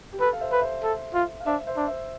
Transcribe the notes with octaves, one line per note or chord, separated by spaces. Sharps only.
G4
A4 B4
F5
C5 E5
B4
C5 E5
A4
F4
F5
D4 C5 E5
C5 E5
D4
C5 E5